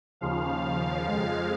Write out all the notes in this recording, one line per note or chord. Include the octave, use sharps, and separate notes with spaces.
D#2 C#3 F3 F5
F2 F3 G#3